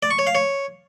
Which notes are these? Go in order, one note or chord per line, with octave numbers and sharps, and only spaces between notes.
D5
C#6
C#5
F5
C#5